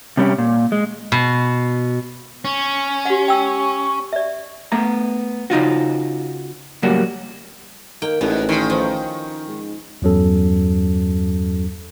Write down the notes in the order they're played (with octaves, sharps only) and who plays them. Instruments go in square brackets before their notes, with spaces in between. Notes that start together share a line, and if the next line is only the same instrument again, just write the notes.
[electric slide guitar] C3 G3 C#4 G4
A#2
G#3
[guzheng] B2
[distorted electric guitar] C#4
[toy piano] G4 F#5
G5 E6
D5 E5
[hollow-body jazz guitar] A3 B3 A#5
C#3 D#4 F4 F#4
A2 C#3 F#3 G3 A#3 F#4
[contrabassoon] D#3 [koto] A#3 G5
[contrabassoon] A1 [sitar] G#2 [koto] B3
[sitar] D#3 [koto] C#4 F4
[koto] F3
[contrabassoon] G#2
[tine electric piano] E2 G2 F#3 C#4 A4